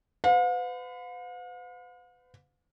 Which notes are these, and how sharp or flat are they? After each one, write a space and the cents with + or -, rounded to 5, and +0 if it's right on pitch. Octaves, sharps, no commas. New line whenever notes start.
B4 +40 F5 +45